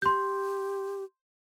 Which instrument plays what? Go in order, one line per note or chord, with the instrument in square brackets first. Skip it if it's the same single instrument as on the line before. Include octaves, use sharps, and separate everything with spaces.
[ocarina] G4 [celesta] C6 G6